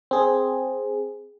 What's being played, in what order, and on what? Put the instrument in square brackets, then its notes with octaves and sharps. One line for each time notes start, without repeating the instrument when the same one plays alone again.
[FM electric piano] C4 G#4